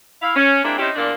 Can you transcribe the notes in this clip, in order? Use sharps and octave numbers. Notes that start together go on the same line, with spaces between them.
E4 F5
C#4
G#3 A#3 C4 D4 E4
C4 C#4 D#4 E4 G4
E2 A#2 A#3 D4